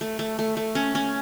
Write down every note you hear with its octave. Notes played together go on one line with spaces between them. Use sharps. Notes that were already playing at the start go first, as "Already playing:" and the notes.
A3
A3
A3
A3
C#4
C#4